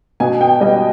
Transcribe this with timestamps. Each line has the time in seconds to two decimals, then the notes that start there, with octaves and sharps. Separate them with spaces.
0.20 B2 G#5
0.41 G5
0.61 G3 B3 D#5